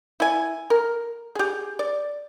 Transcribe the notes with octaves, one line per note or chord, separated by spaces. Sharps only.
E4 G#5
A#4
G4 G#4
D5